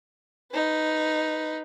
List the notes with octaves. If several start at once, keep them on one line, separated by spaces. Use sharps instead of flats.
D#4 B4